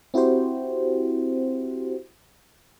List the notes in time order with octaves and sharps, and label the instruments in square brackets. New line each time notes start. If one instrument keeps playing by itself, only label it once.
[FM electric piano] C4 E4 F#4 G4 C5